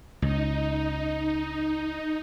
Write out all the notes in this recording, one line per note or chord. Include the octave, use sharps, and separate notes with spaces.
C#2 D#4